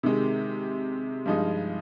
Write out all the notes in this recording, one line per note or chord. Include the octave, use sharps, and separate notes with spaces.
C3 D#3 G#3
G2 F3 G#3 D#4